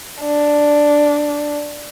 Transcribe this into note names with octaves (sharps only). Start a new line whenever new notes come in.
D4